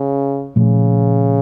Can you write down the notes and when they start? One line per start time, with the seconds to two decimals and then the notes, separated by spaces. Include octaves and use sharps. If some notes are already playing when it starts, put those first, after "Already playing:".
Already playing: C#3
0.56 A#2 C#3 F3 A3